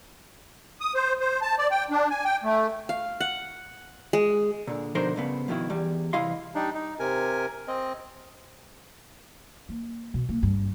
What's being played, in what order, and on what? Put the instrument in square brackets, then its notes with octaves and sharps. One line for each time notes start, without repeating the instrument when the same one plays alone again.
[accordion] D#6
C5
C5
A5
D5
G5
D4
G#5
G5
A3
[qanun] F5
F#5
G#3
[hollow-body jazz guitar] A#2 D3
B2 D3 F3 D#4 A#4 C5
G2 C#3 B3
F2 B2 D#3 E4
E2 G3
C2 E3 E4 D#5 F5 C6
[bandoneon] G3 D4 D#4
D#4
C3 A#4 G#5
C4 D#5
[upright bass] A#3
B2
A#3
G2